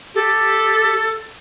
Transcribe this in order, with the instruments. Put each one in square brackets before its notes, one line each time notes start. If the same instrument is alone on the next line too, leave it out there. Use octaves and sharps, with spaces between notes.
[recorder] G4 [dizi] A4